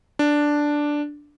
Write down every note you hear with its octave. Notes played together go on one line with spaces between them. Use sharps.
D4